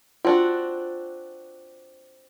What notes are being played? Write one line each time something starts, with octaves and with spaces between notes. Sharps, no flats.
C4 D4 F4 F#4